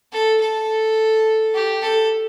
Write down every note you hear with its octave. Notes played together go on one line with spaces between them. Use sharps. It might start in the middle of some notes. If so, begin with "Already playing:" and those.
A4
A4
G4
A4